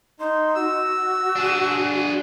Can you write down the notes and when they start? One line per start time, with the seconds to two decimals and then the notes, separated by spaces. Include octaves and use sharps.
0.20 D#4 C6
0.55 F#4 E6
1.36 D4 G#4